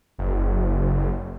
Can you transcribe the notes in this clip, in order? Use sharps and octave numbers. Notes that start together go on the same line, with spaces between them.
F#1